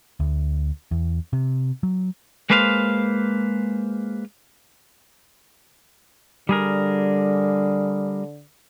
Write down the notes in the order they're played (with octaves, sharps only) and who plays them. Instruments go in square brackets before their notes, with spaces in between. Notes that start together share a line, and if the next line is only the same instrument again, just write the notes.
[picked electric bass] D2
E2
C3
F#3
[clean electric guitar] G#3 A#3 B4 C5 E5 F5
[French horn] D3 [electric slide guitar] G3 G#4 A#4